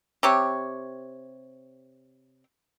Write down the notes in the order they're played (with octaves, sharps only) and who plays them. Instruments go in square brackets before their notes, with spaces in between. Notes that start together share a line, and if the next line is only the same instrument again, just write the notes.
[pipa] C3 G4 C#5